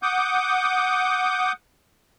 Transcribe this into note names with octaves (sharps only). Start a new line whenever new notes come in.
F#5 D6 D#6 G6